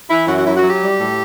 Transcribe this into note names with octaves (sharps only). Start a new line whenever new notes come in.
E3 E4
F#2 F#4
F#4
F#3 E4
F#4
F#3
G4
G3
A2